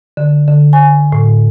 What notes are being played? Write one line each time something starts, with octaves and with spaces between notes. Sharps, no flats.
D3
D3
G#5
A2